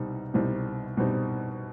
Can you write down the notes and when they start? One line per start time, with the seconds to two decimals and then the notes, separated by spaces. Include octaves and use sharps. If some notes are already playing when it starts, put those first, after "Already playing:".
Already playing: C2 B2 G3 C4 D#4
0.34 C2 B2 G3 C4 D#4
0.97 B2 G3 C4 D#4